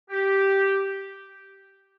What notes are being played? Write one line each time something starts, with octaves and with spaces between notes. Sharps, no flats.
G4